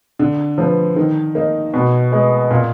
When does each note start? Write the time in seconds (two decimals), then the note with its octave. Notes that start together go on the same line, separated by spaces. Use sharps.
0.19 D3
0.58 F3 B3
0.96 D#3
1.35 A#3 D#4
1.74 B2
2.12 G#3 B3
2.51 A#2